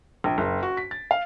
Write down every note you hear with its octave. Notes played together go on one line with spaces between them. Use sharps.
A#1
F#1
F#4
B6
A6
F5